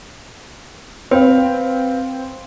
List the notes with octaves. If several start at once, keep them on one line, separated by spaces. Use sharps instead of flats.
C4 B4 F5